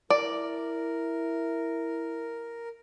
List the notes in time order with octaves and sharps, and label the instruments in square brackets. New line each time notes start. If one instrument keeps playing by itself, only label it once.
[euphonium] E4 [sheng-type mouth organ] A#4 [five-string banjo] D5